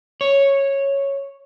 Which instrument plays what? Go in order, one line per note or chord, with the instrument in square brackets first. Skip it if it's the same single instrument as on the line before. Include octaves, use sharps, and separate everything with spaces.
[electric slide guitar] C#5